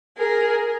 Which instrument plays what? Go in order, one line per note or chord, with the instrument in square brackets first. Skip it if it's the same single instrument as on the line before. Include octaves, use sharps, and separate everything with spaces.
[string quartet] G#4 A#4